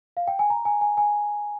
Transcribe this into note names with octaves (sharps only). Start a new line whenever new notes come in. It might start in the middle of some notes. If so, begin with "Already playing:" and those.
F5
G5
G#5
A#5
G#5
G#5
G#5